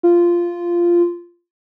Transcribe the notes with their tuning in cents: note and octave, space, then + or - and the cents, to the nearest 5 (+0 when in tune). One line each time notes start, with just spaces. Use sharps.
F4 -10